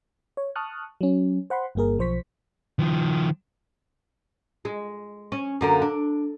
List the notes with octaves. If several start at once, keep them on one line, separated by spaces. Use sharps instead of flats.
C#5
A5 C#6 D#6 F6 F#6
F#3 C#4
C5 F#5 B5 C6
G1 G2 A#3 G#4 A#4
B1 F3 C5 C#6 B6
D#3 F3
G#3
C#4
F#2 D3 A#3
D4